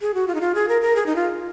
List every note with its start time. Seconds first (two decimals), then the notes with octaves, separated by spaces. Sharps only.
0.01 G#4
0.14 F#4
0.28 F4
0.35 D#4
0.41 F4
0.55 G#4
0.69 A#4
0.81 A#4
0.96 G#4
1.06 D#4
1.16 F4